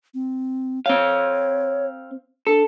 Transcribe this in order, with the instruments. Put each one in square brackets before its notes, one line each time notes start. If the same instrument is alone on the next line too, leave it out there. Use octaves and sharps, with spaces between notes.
[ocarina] C4
[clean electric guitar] C4 F5 [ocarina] C#5
[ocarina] D4 [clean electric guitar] A4